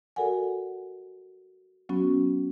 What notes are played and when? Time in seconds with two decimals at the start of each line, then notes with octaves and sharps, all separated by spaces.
0.16 F#4 A4 A#4 D5 F#5 G#5
1.89 F#3 B3 C#4 F#4